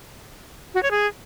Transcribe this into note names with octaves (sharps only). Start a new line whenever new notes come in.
F#4
C#5
G#4